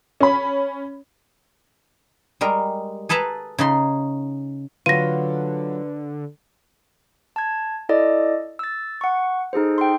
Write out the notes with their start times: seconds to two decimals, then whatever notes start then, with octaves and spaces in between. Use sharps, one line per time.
0.20 C#4 B5
2.41 G3 G#3 A#4
3.09 G#4 A4 B4 A5 A#5
3.58 C#3 D#4 C6
4.86 D3 F#3 F4 B4 A#6 D#7
7.36 A5 G#6
7.89 E4 A4 D5 D#5
8.59 E6 A6
9.01 F#5 C#6
9.53 D#4 G#4 A4 C5
9.78 G5 C6